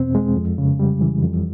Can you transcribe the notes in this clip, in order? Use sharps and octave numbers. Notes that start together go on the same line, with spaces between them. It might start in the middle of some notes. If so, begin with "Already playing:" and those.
Already playing: E2 B2 C4
G#3
F2
C#3
G3
E3
F2